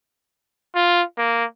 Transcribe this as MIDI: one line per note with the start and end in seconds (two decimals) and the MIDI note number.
0.75 1.02 65
1.17 1.44 58